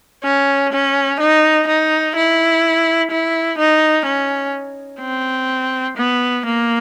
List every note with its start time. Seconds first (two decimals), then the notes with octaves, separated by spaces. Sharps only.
0.24 C#4
0.73 C#4
1.20 D#4
1.67 D#4
2.15 E4
3.11 E4
3.58 D#4
4.06 C#4
5.01 C4
5.97 B3
6.45 A#3